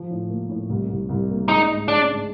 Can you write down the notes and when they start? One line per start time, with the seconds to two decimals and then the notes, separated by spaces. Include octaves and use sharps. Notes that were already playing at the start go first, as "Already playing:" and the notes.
Already playing: F3
0.10 A2
0.30 A#3
0.49 A2
0.69 C2
0.89 C2
1.09 C2
1.29 A#3
1.48 G#3 D#4
1.68 G#2
1.88 G#3 D4
2.08 G#2